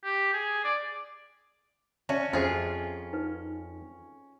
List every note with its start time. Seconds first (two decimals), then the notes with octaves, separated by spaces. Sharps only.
0.04 G4
0.33 G#4
0.64 D5
2.09 C#4 F#4 D5 E5 A5
2.33 F2 F4 G#4 C5 E5 G5
3.13 D#4 B4